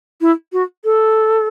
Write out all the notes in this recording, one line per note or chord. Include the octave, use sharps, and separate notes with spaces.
E4
F#4
A4